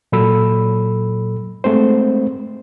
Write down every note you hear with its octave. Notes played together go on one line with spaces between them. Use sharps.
A#2 F#3 A4 B5 E6
G#3 A3 C4 C5